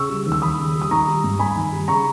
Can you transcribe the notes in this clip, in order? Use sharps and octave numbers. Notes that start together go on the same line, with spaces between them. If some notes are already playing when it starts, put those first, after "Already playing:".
Already playing: C#3 C#6 E6
G3
D#2
E6
D#2 B5 D#6
C#3
G3
D#6
D#3 A#5 C#6
G3
G2
G2 G#5 B5
D#3
G3
C#3 A#5 C#6